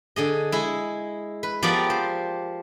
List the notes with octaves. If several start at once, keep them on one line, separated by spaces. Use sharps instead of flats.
D3 G#4 D#5
G#3 E4
B4
F3 B3 G4 A#4 D5 A#5
C5